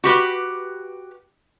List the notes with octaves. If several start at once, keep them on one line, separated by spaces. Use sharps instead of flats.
F#4 G4 B4